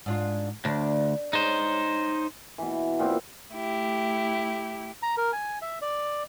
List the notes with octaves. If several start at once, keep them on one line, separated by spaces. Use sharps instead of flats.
G#2 D4 F4
D2 D4
G#3 C#4 D#4 C5
B2 E3
A#2 B3 C4 D6
A3 E4 G4
A#5
A#4
G#5
E5
D5